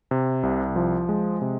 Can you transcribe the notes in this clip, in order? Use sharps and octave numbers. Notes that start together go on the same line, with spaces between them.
C3
C2
F3
G#3
C3